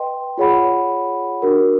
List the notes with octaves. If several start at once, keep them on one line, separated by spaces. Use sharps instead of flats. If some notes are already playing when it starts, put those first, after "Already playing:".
Already playing: B4 D#5 G5 C6
F4 G#4 C#5 F#5 B5
D4 F#4 A#4